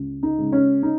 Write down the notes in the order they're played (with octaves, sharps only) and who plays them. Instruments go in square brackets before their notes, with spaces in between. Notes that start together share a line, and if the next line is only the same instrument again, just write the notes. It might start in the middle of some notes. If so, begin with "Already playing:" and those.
Already playing: [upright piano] C#2
D#4
C#3 G#3
C#4
D#4